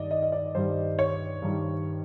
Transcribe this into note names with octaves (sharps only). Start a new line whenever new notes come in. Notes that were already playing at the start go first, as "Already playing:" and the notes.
Already playing: G2 D#3 G3 D5 D#5
D#5
D#5
D5
G2 D#3 G3 C5
C#5
G2 D#3 G3